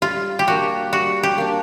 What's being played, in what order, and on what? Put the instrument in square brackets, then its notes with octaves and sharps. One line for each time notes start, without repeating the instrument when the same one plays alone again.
[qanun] G3 [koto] F4
[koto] G4
[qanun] A#3 D4 [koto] F#4
[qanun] G3 [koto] F#4
[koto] G4
[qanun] A#3 D4